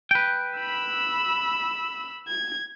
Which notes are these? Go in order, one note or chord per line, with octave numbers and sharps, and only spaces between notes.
B4 G5
B5 E6
G#6